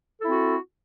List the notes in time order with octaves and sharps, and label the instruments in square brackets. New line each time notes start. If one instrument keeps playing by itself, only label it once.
[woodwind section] A4
E4
C4
F#4